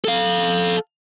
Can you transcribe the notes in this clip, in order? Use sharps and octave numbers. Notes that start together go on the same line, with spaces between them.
A4 F5